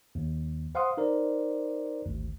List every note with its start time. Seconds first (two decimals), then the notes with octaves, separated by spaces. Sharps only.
0.15 D#2
0.75 C5 F5 F#5 C6 D#6
0.97 D#4 A#4 C5 D5
2.06 G#1 D2